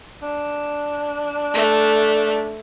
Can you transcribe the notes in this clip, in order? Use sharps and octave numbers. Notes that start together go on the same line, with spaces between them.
D4
A3